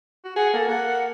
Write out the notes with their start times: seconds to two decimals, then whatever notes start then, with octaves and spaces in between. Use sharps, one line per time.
0.25 F#4
0.36 G#4 F#5
0.53 A#3 A4
0.68 A#3 F#5